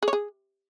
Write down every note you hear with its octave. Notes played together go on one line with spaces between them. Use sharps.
G#4
C#5
G#4